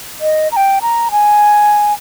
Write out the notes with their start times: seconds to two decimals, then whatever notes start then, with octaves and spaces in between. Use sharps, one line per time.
0.21 D#5
0.52 A#5
0.56 G5
0.82 A#5
1.12 G#5